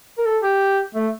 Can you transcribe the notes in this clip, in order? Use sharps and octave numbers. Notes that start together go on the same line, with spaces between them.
A#4
A4
G4
A3